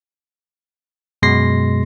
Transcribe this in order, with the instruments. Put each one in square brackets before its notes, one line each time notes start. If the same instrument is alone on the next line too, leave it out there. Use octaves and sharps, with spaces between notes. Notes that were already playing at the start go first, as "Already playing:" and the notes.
[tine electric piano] F#2 B2 G#3 C6 A#6 C7